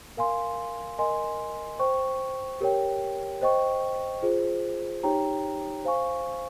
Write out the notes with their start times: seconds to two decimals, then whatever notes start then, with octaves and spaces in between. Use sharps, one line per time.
0.17 A#4 F5 G#5 C6
0.99 A#4 D#5 G#5 C6
1.79 C5 G5 C#6
2.61 G4 A#4 C#5 G5
3.41 C5 D#5 G5 C#6
4.23 F4 G#4 C5
5.03 D#4 G4 C#5 G5 A#5
5.84 C5 F5 G#5 C#6